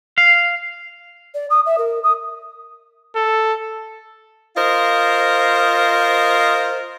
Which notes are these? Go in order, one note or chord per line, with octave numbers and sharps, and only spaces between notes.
F5
D5
D#6
E5
A#4
D#6
A4
F4 A#4 C5 D#5